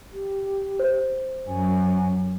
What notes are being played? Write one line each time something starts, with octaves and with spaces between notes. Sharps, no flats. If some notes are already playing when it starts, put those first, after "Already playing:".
G4
C5
F#2 G#5